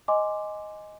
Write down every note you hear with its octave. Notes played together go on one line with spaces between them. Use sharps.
D#5 G#5 C6 D6